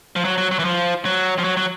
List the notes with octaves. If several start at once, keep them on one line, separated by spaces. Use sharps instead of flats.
F3
F#3
F#3
F#3
E3
F3
F#3
F3
F#3
F#3